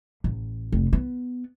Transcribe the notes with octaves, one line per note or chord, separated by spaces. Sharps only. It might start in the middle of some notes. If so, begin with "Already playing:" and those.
A1
F1
B3